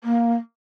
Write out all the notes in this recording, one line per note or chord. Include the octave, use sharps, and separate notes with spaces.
A#3